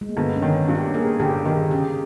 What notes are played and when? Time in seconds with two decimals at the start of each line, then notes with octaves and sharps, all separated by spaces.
0.01 G#3
0.09 A#3
0.17 G1 B3
0.36 C#4
0.42 D#3
0.68 G2
0.75 G4
0.94 A#3 G#4
1.20 G1 G4
1.45 D#3 G#4
1.71 C#3 G4